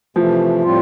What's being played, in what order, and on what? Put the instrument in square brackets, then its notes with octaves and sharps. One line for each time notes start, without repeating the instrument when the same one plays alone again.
[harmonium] C3 E3 A3 [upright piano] F3
[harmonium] A2 G3 C4 F4